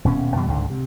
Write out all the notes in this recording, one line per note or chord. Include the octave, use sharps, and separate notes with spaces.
D#1 B2 C#4
F#2 B2 E3 G3
C#2 G#2 D3
C3